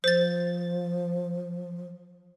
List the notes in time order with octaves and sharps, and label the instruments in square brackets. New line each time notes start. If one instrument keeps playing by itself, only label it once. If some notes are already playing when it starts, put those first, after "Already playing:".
[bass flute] F3 [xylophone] C5 A6